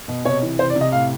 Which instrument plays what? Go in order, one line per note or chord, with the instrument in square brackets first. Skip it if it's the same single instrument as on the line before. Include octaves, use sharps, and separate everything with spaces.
[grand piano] B2
C3 C#5
E3
C3 C5
D5
C3
D#5
A2 F5